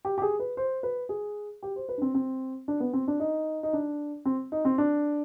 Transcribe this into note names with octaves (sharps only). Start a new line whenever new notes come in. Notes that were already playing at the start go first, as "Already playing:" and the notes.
G4
G4
G#4
B4
C5
B4
G#4
G4
C5
B4
D4
C4
C4
D4
B3
C4
D4
D#4
D#4
D4
C4
D#4
C4
D4